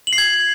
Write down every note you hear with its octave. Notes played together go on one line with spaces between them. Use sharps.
F#7
C7
G#6